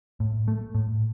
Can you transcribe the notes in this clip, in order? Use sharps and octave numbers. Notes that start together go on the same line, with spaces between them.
A2
A3
A2